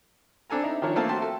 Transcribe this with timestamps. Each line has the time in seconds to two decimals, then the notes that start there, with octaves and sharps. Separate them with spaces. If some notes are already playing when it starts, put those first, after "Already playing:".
0.50 C4 D4 A4 G#5 A#5
0.64 D#4 E4 A#5
0.82 D#3 F3 D4 A#4 C#5
0.96 A3 A#3 C4 A4 F5 A5
1.09 F#4 E5 G5 A5 C6
1.22 A4